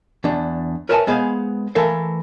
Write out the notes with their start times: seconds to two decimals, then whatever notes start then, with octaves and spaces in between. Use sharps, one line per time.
0.24 E2 D4
0.89 A#4 B4 C#5 E5 G#5 A5
1.07 G#3 B3 G#4 C5 F5
1.75 E3 A3 A4 A#4 F5